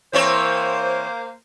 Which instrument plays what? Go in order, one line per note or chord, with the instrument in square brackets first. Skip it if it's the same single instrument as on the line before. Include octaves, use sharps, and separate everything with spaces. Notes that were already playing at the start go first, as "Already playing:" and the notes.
[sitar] E3 C4 C#5 [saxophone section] A#3 C5